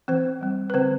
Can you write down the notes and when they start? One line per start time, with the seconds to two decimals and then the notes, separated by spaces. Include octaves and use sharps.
0.08 E3 C4 C5
0.41 G3 C4
0.70 B4
0.74 D3 C4 C5